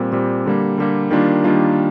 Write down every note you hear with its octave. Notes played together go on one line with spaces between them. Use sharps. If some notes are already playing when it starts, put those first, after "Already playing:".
Already playing: A#2 G3 C4
A#2 G3 C4
D3 G3 A#3
D3 G3 A#3
D#3 G3 A#3 D4 F4
D#3 G3 A#3 D4 F4